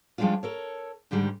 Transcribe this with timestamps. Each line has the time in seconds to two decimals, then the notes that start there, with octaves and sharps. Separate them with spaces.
0.18 F3 G3 G#3 C#4 D4 F4
0.43 A4 A#4 C#5
1.11 G#2 D3 D#3 G3 G#3